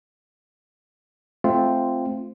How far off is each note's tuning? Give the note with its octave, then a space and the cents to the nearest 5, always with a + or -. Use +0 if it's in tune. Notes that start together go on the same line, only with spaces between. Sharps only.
A3 -20 C4 +0 F4 -10